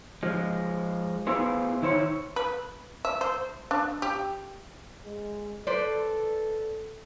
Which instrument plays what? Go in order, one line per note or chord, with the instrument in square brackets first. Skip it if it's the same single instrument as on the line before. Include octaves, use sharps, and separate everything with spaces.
[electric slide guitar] F3 G#3
B3 E4 F4 G#4 C5
D#3 E4 C5 C#5
[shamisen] B4
E5
C5
D4
G4
[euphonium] G#3
[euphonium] A4 [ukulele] B4 C5 D5